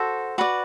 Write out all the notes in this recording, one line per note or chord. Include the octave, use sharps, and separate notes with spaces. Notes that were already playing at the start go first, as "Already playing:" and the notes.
Already playing: F#4 A4 C5
F#4 B4 D5